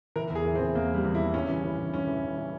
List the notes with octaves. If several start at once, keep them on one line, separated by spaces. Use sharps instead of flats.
E3 A#4
E2
G#4
E3
C4
E3
E2 A#3
E3 G3
E2
E4
E3
G2 C#4
E3
E3
E3
G2 C#4
E3
G2
E3